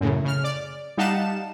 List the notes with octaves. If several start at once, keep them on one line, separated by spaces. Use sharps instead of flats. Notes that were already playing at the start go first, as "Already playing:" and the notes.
F#2 A2 C#3
C#3 F6
D5
G3 D#4 F5 F#5 A5 E7